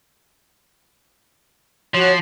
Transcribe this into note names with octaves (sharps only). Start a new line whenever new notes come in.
F3 F#4 C#5